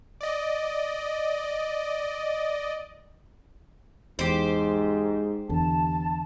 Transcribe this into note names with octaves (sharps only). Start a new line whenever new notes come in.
D5 D#5
E2 G#2 G4 C5
E2 D3 A5